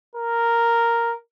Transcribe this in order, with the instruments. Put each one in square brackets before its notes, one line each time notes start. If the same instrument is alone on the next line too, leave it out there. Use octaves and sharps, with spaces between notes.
[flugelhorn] A#4